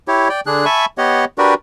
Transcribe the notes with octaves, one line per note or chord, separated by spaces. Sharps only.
E4 G4 C#5
D5 G5
D3 D4 G#4 F#6
E5 G#5 A5 B5 C#6
B3 G4 C#5 D#5 F#5
D4 F#4 G4 A#4 B4 D5